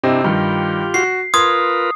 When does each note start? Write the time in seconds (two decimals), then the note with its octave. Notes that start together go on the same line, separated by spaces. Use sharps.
0.04 C3 C4 D4 E4 D#5
0.24 G2 D#3 G3 F4 G4
0.94 F#4 C7
1.34 F4 A#4 B4 C6 D#6 G#6